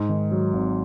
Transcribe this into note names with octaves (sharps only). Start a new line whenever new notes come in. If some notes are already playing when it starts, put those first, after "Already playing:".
Already playing: G#2
D#3
F#3
G#1